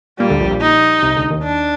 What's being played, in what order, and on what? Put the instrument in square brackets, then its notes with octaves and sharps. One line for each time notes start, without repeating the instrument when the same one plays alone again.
[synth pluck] A#2 A#3 [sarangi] G3
[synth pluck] D2 D3
A#1 A#2
A#1 A#2
[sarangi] D#4
[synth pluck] C2 C3
D2 D3
D#2 D#3
[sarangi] D4